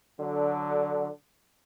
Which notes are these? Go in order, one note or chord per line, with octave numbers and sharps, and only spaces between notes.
D3 F#3